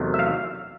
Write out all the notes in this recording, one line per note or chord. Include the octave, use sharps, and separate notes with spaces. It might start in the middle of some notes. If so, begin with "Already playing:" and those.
Already playing: E2 C3 D#3 F#3 A3
E5
F5